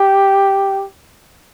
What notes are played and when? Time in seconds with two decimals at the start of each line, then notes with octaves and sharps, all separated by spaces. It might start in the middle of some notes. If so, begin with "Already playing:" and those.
Already playing: G4